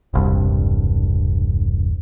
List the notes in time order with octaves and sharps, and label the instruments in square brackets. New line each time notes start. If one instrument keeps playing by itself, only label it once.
[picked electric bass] E1 C2 G2